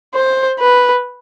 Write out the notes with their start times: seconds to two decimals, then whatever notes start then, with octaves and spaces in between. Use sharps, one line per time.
0.14 C5
0.60 B4